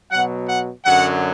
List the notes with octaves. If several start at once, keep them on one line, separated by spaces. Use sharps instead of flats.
B2 F#3 F#5
F#5
F#2 D3 F#3 F#5